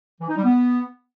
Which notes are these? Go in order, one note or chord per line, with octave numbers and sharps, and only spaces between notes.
E3
D#4
G3
B3